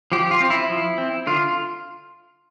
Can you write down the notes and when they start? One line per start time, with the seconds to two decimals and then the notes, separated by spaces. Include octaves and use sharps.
0.12 F3 G4
0.31 F4
0.40 C4
0.50 E4
0.69 F3
0.98 C4
1.27 D3 F4